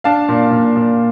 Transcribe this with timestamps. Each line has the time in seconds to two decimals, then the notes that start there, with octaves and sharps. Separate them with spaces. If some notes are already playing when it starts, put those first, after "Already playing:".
0.04 D4 F5 A5
0.29 A#2
0.51 A#2
0.76 A#2